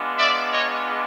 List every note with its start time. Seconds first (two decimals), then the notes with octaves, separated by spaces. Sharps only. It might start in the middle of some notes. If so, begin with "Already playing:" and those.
Already playing: G#3 B3 D4 F4
0.17 D5 E5
0.52 C#5 D#5